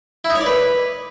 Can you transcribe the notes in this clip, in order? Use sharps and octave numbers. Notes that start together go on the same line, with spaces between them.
E4
D#4
C#5
D5
B4